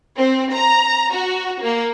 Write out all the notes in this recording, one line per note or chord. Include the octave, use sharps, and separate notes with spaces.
C4
A#5
F#4
A#3